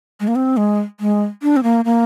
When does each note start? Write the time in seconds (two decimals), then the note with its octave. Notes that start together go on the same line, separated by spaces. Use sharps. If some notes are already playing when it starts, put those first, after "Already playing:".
0.20 G#3
0.28 A#3
0.35 C4
0.57 G#3
1.00 G#3
1.42 D4
1.56 C4
1.63 A#3
1.85 A#3